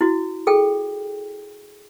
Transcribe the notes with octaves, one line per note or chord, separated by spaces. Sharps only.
E4 F#4
G#4 A4 G5